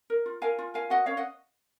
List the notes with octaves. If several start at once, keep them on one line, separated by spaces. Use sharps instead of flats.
A#4
F4
A#4 F5 G#5
F4
A#4 F5 G#5
F#4 D#5 F#5
C#4 C#5 F5
D#5 F#5